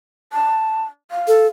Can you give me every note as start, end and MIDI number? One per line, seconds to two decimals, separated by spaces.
0.33 0.83 81
1.11 1.45 77
1.28 1.47 69